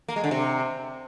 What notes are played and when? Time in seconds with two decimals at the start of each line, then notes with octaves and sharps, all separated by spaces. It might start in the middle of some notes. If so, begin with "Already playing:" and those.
0.08 A#3
0.16 G#3
0.24 D3
0.31 C3